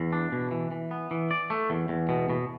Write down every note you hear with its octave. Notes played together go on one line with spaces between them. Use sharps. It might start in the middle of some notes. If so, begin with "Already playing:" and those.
Already playing: E2
D4
B2
E3
E3
B3
E3
D5
A3
E2
E2
B2
B2